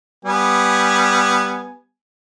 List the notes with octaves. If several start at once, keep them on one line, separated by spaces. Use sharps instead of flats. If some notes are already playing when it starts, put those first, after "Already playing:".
G3 B3 G#5